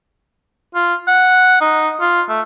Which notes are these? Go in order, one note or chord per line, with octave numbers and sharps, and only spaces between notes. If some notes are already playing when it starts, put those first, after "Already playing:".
F4
F#5
D#4
F4
A3